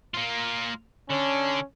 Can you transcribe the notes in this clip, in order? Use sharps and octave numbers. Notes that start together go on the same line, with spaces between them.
A#3 F4
D3 C#4 D4